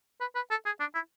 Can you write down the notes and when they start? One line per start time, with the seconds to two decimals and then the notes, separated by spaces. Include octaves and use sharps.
0.21 B4
0.35 B4
0.51 A4
0.66 G#4
0.80 D4
0.95 E4